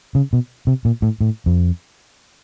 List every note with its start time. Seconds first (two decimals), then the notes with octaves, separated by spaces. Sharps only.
0.15 C#3
0.33 B2
0.67 C3
0.85 A#2
1.02 A2
1.21 A2
1.46 F2